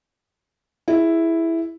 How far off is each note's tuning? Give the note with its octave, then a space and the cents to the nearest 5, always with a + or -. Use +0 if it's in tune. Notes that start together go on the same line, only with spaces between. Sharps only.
E4 +0 G#4 +0